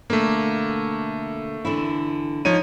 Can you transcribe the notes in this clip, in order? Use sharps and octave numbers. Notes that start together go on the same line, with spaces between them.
B2 D3 A3 A#3
D3 E3 E4
F3 D#4 C#5 D#7